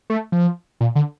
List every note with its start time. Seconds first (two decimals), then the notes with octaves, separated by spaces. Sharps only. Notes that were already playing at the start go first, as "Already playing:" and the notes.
0.10 A3
0.32 F3
0.81 A#2
0.96 D3